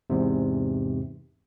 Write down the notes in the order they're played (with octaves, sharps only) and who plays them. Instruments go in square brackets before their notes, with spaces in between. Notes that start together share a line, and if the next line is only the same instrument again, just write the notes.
[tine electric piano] E2 G#2 C3